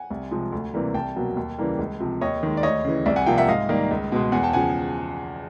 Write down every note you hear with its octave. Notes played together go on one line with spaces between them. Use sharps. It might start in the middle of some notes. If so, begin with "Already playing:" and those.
Already playing: F#5 G#5
C2
C3 F3 G#3
D2
C3 E3 G3 A#3
C2 G5 A5
B2 F#3 A#3
D#2
C#3 E3 G3 A#3
C#2
C3 F3
D#2 C#5 D#5
D#3 G#3
D5
D2 C#5 D#5
C#3 E3
C2 D5 E5
F#5 G#5
C3 F3 A#3 F5 G5
E5 F#5
G#2 D#5 F5
D#3 G3 A#3
C#2
B2 G#3
E2 F#5 G#5
G5 A5
C#3 F3 F#5 G#5